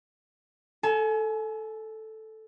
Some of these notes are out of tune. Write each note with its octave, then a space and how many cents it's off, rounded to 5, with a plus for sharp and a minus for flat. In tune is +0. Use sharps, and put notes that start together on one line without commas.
A4 +0 G#5 +35